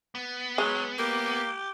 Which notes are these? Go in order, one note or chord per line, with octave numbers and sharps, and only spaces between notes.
B3
F#3 G#3
A#3 G4